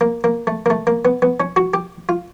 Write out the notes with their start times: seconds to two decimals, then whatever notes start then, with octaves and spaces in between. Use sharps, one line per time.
0.01 A#3
0.24 A#3
0.47 A3
0.66 A#3
0.70 A3
0.87 A#3
1.05 B3
1.22 B3
1.40 C#4
1.56 F#4
1.74 G4
2.09 F4